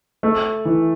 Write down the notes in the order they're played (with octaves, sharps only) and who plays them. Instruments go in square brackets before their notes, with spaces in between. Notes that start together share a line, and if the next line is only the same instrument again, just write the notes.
[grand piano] A3
E3